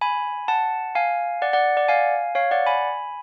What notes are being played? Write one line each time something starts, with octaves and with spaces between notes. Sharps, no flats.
G#5 B5
F#5 A5
F5 G#5
D5 F#5
D5 F#5
D5 F#5
F5 G#5
C#5 F5
D5 F#5
G#5 B5